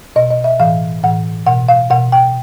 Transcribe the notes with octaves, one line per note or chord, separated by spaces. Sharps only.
B2 D#5
D#5
E5
A2 E3 F5
A2 E3 F#5
B2 F#5
F5
B2 F#5
G5